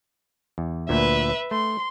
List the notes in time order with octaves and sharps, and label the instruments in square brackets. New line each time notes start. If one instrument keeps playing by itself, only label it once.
[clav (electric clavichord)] E2
[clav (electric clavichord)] D2 A#2 [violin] B4 E5
[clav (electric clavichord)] A3 [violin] C6